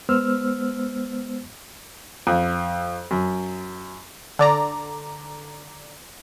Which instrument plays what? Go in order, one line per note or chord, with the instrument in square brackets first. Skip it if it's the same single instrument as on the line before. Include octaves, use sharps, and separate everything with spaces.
[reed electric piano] G#3 B3 C5 E6 F6
[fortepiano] F2
F#2
[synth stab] D3 D5 A#5